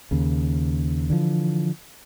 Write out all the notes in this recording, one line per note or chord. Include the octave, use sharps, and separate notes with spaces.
D#2 C#3
D3 E3 F3